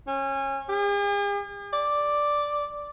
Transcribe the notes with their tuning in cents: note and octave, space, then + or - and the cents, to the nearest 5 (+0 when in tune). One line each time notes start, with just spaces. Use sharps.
C#4 -25
G#4 -45
D5 +0